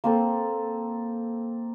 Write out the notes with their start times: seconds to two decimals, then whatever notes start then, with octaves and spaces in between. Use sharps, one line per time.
0.04 A#3 C4 A4